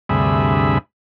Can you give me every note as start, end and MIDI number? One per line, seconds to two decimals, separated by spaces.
0.09 0.78 38
0.09 0.78 43
0.09 0.78 48
0.09 0.78 68
0.09 0.78 76
0.09 0.78 83